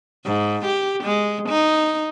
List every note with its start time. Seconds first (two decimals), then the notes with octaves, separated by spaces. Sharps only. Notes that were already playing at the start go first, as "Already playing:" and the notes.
0.25 G#2
0.65 G4
1.04 G#3
1.49 D#4